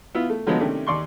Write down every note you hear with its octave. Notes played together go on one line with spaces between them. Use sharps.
B3 E4 F4
A3
D3 F3 F#3 G#3 B3
C3 D#3 A3 C#4 D4
D#2 D5 C6 C#6